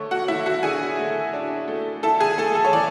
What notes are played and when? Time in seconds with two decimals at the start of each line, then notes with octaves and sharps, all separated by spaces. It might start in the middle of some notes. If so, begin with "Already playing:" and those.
Already playing: D3 A3 C#5 C#6
0.11 F#4 F#5
0.28 A3 E4 E5
0.46 F#4 F#5
0.63 D3 G#4 G#5
0.99 A3
1.33 D4
1.68 A3
2.03 E4 A4 A5
2.20 G#4 G#5
2.38 A3 A4 A5
2.55 A4 A5
2.65 C#5
2.73 E3 D5